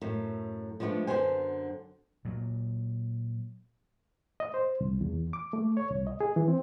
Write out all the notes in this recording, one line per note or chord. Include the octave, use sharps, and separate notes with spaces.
F#2 A2
F3 G#3 A3 B3 D4
F#2 D3 F#3 B3 C5 G#5
A#2 F#3
D#5
C5
C2
E2
D6
A3
C#5
C2
D#5
G#4
E3
C4